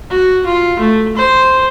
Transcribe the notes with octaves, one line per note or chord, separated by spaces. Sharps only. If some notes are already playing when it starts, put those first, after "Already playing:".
F#4
F4
A3
C5